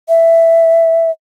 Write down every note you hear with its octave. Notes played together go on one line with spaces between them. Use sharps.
E5